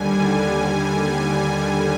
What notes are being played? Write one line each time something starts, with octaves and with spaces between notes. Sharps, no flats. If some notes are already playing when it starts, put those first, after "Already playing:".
Already playing: D#2 D3 G3 G#5